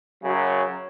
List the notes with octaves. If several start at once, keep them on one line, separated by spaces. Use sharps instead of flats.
F#2 C#3 F#3